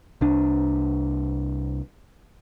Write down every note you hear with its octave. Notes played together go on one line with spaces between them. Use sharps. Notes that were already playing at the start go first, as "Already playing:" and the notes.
C2 D4